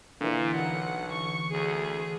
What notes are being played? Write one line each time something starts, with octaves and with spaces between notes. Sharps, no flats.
A#2 D3 E3
B1 F#5
C#6
D2 G#4